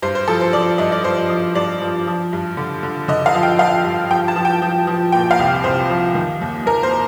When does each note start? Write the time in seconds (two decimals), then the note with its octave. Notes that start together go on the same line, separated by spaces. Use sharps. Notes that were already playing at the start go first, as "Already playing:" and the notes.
0.02 G2 C5
0.15 C5
0.28 F3 A4
0.41 C5
0.53 F3 D5
0.78 G2 D#5
0.92 D5
1.04 F3 C5
1.29 F3
1.55 G2 D5
1.81 F3
2.07 F3
2.33 G2
2.57 D3
2.83 D3
3.08 D3 D#5
3.26 F5
3.34 F3
3.43 G5
3.59 F3 F5
3.85 G2
4.10 F3 G5
4.28 A5
4.36 F3
4.45 G5
4.62 F3
4.87 F3
5.12 A#2 G5
5.31 F5
5.39 C2
5.64 C2 C5
5.90 F3
6.15 D#3
6.41 D#2
6.66 D#2 A#4
6.83 C5